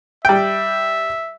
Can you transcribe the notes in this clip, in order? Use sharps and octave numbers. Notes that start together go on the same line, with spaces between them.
G3 E5 G5